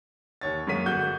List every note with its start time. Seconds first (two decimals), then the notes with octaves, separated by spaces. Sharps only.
0.41 D#2 C#5 A6
0.67 F#2 G#3 A#3 C#5 B6 D#7
0.86 G1 F#4 G6